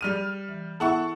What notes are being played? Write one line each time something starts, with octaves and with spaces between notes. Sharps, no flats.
G3 F6 D#7
E3
B3 E4 A4 E5 F#5 C#6